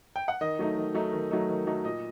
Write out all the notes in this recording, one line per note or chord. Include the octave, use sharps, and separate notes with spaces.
G5
F#5
D#3 D#5
F#3 A3 D#4
D#3
F#3 A3 D#4
D#3
F#3 A3 D#4
D#3
F#3 A3 D#4
A#2 D#5